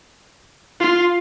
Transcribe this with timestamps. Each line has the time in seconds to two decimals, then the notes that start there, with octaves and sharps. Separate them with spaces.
0.80 F4